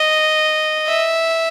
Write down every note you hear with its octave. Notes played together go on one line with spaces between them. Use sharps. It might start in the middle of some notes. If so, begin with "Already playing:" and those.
Already playing: D#5
E5